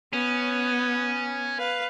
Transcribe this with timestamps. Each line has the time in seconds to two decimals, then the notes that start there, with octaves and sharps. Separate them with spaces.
0.13 B3 C#4
1.59 B4 F5